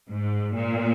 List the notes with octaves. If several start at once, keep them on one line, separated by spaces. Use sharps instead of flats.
G#2
A#2